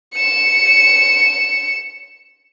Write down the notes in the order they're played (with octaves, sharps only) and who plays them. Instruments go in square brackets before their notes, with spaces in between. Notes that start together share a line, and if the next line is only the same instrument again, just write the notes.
[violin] C#7 E7